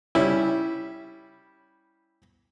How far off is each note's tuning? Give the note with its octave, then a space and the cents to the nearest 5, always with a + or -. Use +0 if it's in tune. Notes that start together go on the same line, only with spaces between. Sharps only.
G3 +0 C#4 +0 E4 -5